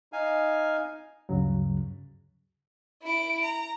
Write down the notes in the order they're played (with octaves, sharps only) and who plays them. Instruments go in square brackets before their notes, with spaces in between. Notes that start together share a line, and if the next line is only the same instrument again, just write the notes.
[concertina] D#4 F5 G#5
[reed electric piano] D2 G2 C#3 F#3
[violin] E4 D7
A#5